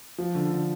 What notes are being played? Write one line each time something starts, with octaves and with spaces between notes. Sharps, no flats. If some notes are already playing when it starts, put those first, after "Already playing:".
F3
D3
D3